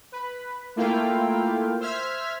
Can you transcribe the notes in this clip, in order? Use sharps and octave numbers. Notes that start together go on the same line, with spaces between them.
B4
A3 A#3 E4 F4 F5 G5
C5 E5 F6 G#6 B6